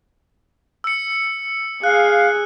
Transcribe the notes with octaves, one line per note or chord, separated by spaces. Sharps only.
E6 C#7
G#4 F5 F#6